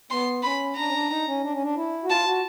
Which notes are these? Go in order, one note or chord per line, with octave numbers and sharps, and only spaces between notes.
B3 C6
C#4 B5
D4 A#5
C#4
D4
D#4
C#4
D4
C#4
D4
E4
F#4
F4 A5
F#4